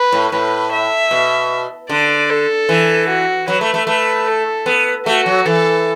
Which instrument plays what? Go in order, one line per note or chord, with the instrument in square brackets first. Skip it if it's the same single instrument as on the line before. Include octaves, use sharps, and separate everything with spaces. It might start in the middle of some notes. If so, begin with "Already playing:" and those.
Already playing: [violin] B4
[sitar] A2
[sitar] A2 [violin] B4
[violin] E5
[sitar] B2
[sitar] D3 [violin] D5
[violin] A4
[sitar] E3
[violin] F#4
[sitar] F#3 [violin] B4
[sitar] A3
A3
[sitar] A3 [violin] B4
[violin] A4
[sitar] B3
[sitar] A3 [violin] F#4
[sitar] F#3
[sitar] E3 [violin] A4